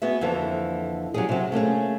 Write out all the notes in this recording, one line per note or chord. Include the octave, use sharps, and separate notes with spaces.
B3 F#4 G#4 E5
F2 D3 E3 A#3
F#3 G3 C#4 G4 G#4
C3 F#3
A3 A#3 C#4 G#4